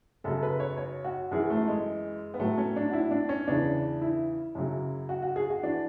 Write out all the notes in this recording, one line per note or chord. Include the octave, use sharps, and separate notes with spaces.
F#2 C#3 F#3 A4
B4
C#5
C#5
F#4
F#2 E3 G#4
A3
G#3
B3
A2 F#3 A3
C#4
D4
F#4
E4
D4
C#4
E2 C#3 E3 D4
E4
F#2 C#3 F#3
F#4
F#4
G#4
F#4
E3 D4